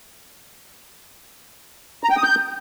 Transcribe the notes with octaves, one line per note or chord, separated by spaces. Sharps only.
A#5
G5
D#6
G6